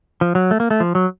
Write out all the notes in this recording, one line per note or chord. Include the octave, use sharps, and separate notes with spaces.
F3
F#3
A3
A#3
A3
F3
F#3